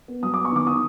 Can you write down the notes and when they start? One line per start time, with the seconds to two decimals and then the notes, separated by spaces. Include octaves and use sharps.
0.08 B3
0.23 F#3 D#6
0.34 D6
0.38 B3
0.45 C#6
0.52 D#3 D6
0.67 D#3 D#6